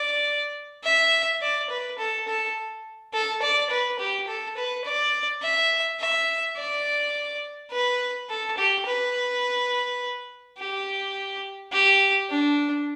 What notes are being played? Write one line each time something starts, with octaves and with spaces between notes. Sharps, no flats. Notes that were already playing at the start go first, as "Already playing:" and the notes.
Already playing: D5
E5
D5
B4
A4
A4
A4
D5
B4
G4
A4
B4
D5
E5
E5
D5
B4
A4
G4
B4
G4
G4
D4